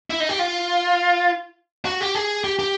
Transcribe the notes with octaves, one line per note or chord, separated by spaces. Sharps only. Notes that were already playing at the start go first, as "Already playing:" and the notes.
E4
D#4
G4
F4
F#4
G4
G#4
G4
G4